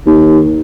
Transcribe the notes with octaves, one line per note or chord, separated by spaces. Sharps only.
D#2